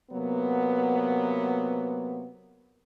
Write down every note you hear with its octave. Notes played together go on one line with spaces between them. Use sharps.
C3 F#3 A#3 B3